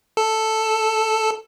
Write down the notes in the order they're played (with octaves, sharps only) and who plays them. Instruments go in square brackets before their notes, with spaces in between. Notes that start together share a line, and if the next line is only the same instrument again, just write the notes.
[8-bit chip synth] A4